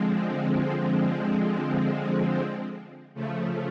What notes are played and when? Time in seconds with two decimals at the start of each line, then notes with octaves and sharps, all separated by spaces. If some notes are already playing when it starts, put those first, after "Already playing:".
Already playing: D3 F3 G#3 C4
3.14 C#3 F3 A3